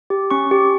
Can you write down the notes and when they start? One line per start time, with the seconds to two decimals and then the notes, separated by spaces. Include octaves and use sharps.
0.10 G4
0.31 C#4 C#6
0.51 G4